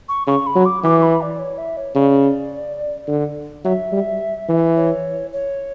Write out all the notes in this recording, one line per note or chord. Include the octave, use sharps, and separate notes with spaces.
C#6
C#3 C#6
B5
F#3
D6
E3 D6
B5
D5
C#5
E5
C#5
C#3 D5
D3
F#3 E5
G3
E3
C#5
C#5